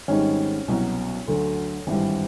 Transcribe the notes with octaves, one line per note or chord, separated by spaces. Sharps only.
G#1 G#2 D#3 G3 C#4
C2 B2 F#3
D2 D3 F#3
G#1 G2 E3 G3